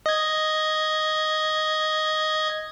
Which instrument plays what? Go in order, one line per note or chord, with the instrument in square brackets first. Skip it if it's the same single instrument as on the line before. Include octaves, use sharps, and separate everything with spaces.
[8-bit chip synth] D#5 G#6